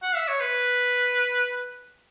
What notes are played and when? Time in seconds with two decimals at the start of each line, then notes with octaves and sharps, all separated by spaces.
0.02 F#5
0.15 E5
0.28 C#5
0.40 B4